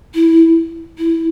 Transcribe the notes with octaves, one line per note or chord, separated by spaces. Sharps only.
E4
E4